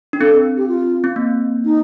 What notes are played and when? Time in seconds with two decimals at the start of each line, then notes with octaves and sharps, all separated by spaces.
0.13 D4
0.20 C4 A4
0.57 G4
0.68 F4
1.04 C4
1.16 A#3
1.65 D#4